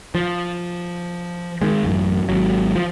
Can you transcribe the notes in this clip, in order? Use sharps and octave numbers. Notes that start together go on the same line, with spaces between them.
F3
D#3 G#3
A1 F#2
G#1 F#3
F3